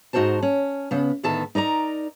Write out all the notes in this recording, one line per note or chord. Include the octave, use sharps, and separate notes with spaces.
G#2 D#4 F#4 A#4 C5 A5
C#4
C#3 B3
D2 A2 D#3 B3 A4 A5
D#4 A#4 D5 A#5